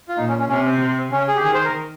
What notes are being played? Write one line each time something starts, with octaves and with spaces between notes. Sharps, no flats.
F4
A#2 D#4
C#4
C#4
C3 C#4
C4
C3
C#3 C#4
G#4
G4
D#3 G#4
C5
A#4